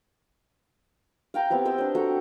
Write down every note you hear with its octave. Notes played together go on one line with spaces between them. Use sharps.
F5 G5 A#5
B3 C4 E4 G4
C5 D#5 E6
D4 C5
F#4 A4 E5 A#5